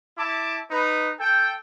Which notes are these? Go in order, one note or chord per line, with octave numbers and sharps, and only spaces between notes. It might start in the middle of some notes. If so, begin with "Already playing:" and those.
E4 A5 D6
D#4 B4
A4 G5